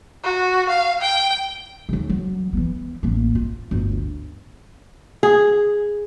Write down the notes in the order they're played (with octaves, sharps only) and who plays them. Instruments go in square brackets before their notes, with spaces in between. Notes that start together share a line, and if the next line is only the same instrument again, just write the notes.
[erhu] F#4
F5
G5
[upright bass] D#2 C#3
F#3
E3 B3
A1 A#3
F4
G1 D2
[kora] G#4